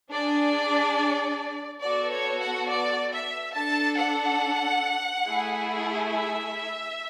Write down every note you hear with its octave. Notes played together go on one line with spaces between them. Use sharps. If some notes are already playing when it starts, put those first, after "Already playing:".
D4 G#4 D5
B3 F#4 A4 D5
C#5
F#5
D5
E5
D4 A4 A5
F#5
A3 E4 G#4
E5